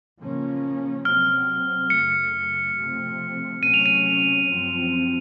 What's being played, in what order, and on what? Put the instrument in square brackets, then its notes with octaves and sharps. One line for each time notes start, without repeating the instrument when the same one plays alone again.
[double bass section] C#3 F3 A#3 C#4
[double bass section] C3 F#3 C4 [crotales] F6
[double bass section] F#2 C#3 A3 [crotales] C#7
[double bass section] C3 F3 A3 C4
[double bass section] C3 F#3 A3 C#4 [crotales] D#7
[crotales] F7
D#7
[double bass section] F#2 F3 C4